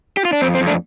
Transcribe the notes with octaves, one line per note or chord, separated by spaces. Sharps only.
G4
F4
D4
F2 C4
C4
F2
A3 D4